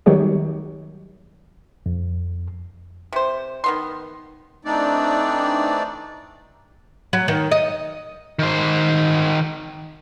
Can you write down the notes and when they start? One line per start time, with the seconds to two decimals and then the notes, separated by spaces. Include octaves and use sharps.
0.06 D#3 F#3 G3 G4 C#5
1.86 F2
3.12 C3 C5
3.64 D#3 B3 C6
4.65 E3 A3 C4 D4 D#4 D5
7.13 F#3
7.28 D#3
7.52 D#5
8.39 D#3 C5